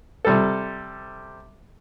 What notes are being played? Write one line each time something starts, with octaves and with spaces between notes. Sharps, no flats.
C3 G3 A4